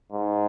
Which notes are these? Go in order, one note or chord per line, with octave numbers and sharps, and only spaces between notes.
G#2